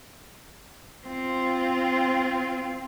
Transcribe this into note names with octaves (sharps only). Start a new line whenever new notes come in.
C4 F4